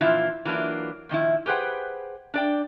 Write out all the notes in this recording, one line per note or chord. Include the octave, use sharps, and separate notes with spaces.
A#2 E3 F3 E4 F4
E3 F#3 A#3 D4 F4
A#2 D#3 F3 E4
G4 G#4 B4 C5 F#5 G5
D4 D5 G5